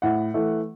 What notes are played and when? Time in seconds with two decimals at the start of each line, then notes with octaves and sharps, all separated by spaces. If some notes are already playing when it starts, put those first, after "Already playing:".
0.02 A2 F#5
0.34 E3 A3